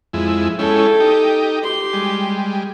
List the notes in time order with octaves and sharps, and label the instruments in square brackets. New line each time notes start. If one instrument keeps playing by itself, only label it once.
[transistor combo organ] F2 G#3 E4
[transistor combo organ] G#3 C#4 E4 [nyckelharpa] A4 G5
[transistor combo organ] D#4 G4
[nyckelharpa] G4 C6
[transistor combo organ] G3 G#3